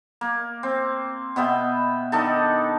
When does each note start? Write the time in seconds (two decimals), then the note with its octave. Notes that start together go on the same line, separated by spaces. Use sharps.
0.21 A#3
0.63 C4
1.36 B2 B3 E5 G5
2.12 D#3 D4 D#4 A4